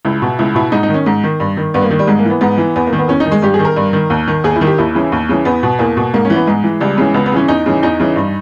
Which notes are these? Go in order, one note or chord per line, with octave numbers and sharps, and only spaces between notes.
C#2 E4
B2
C#2 E4
B2 E4
G#2 D#4
D#4
D#3
C#4
G#2
D#3
G2
D#3
G2 B3
A#3
D#3
G3
G#2 G#3
A#3
E3 B3
G#2 B3
E3
E2 B3
A#3
D#3
B3
E2 C#4
D#4
D#3
G#3
G2 G4
G#4
D#3
A#4
G2
D#3
D#2
D#3
D#2 G#4
E4
D#3
G4
D#2 E4
C#3 E3
D#2
C#3 E3
E2 B3
B2
E2 A#3
B2
G#2 A#3
C#4
E3
B3
G#2 G#3
E3
C#2 G3
C#3 E3 G#3
C#2 B3
B3
C#3 E3 C#4
E2 D#4
C#3 E3
E2 D#4
C#3 E3
G2